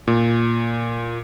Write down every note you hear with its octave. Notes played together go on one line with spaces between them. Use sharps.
A#2